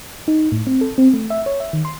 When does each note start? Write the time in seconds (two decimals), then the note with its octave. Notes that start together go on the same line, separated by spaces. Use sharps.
0.28 D#4
0.52 A2
0.67 C4
0.81 A4
0.98 C4
1.14 A3
1.30 E5
1.46 C#5
1.60 E5
1.73 D#3
1.85 C6